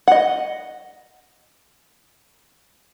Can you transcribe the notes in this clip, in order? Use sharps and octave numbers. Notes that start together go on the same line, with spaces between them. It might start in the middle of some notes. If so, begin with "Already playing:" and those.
D#5 F#5